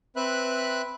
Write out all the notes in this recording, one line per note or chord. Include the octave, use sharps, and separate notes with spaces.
C4 B4 E5 B5 F#6